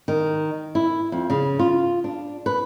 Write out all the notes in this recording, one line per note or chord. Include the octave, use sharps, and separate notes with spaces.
D#3
E4
F2
C#3
F4
D4
B4